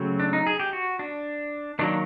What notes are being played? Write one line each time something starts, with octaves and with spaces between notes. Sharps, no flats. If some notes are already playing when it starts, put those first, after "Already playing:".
Already playing: C#3 F#3 A3 C4
D4
D#4
G#4
G4
F#4
D4
D#3 F#3 A#3 D4